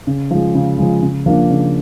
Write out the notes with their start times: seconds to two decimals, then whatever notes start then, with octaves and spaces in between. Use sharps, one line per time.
0.07 C#3
0.31 F3 G#3
0.55 C#3
0.78 F3 G#3
1.02 C#3
1.26 F3 A#3 D4
1.50 C#3